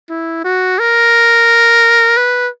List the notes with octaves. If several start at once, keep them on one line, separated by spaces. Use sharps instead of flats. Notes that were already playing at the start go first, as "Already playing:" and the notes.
E4
F#4
A#4
B4